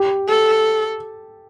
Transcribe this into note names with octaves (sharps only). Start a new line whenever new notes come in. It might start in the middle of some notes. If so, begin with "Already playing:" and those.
Already playing: G4
A4